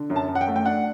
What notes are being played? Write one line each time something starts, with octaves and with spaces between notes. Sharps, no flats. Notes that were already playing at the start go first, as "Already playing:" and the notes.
Already playing: D3
F#2
A5
F#2
F#5
G5
A3
G5
D4 F#5